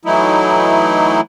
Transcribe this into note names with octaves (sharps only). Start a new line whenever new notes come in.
E3 F#3 A3 D#4 E4